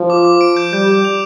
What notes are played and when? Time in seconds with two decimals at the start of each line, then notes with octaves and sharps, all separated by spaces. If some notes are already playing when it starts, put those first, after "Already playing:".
Already playing: F3
0.10 D6
0.25 D6
0.41 D7
0.57 G6
0.73 G3 G6
0.88 G6
1.04 F7